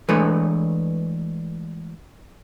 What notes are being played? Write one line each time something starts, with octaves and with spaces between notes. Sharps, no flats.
E3 G#3 A3 D4 B4 C#5